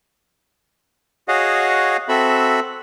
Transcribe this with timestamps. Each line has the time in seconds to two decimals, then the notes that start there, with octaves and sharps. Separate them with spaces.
1.28 F#4 G#4 C#5 D#5 F5 F#5
2.09 C4 F#4 A4 E5 B5